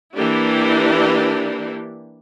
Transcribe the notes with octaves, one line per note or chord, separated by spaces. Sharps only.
E3 A#3 D4 E4 G4